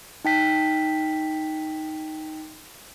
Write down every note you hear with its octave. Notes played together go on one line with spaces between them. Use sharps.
D#4 G5 B6